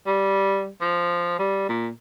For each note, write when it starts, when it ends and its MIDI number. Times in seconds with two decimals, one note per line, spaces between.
0.07 0.68 55
0.81 1.37 53
1.39 1.65 55
1.69 1.88 46